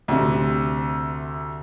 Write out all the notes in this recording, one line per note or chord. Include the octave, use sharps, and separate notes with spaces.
D2 C3